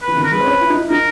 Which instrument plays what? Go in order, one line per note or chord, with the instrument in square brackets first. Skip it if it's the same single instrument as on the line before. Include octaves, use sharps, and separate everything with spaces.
[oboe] B4
[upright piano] E3
D#3
[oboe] A#4
[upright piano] G#3 [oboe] B4
[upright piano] C4
C#4
E4
D#4
E4
[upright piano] D#4 [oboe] A#4